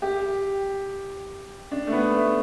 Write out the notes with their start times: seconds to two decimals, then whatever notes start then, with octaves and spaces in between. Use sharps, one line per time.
0.02 G4
1.71 D4
1.87 A3
1.92 B3
2.14 A3